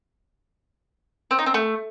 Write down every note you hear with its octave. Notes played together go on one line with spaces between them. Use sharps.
C4
D#4
C4
A3